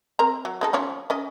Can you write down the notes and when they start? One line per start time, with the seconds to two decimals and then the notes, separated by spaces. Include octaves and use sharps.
0.19 C4 A#4 A#5
0.45 F#3
0.61 G#3 D#4 A4
0.73 F3 C#4 C#5
1.10 C#4 D#5